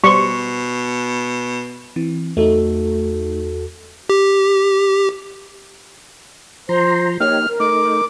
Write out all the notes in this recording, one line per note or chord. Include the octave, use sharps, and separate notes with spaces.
B2 G3 C5 C#6
E3 C4
E2 A3 D#4 F#4 A4
G4
F3 C5 A#5 C6
A#3 D#4 G4 C#5 F6
A#4
A3 D#4 D6